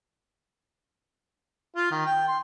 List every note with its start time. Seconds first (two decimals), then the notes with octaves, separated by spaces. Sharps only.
1.76 F4
1.91 D#3
2.06 G5
2.28 C6